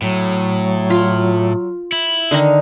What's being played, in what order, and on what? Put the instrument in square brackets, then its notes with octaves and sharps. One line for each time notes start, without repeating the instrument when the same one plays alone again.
[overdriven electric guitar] A2 [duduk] F#3
[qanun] F4
[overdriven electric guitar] E4
[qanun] D3 D#3 D#4